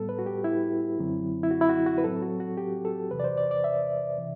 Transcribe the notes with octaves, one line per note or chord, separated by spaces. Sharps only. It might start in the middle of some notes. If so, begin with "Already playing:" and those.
Already playing: A2 G3 B3 A4
B4
F#4
G4
E4
F#2 D3 F#3 C4
E4
F#4
E4
F#4
F#4
B4
A2 F#3 C4 A4
F#4
F#4
G4
A4
E2 C3 E3 B4
D5
C5
D5
D5
E5
C3 E3